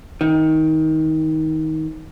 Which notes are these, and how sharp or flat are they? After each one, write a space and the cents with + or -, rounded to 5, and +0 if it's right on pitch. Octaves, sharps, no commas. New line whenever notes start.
D#3 +20